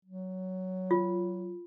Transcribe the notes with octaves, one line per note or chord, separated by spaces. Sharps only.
F#3
F4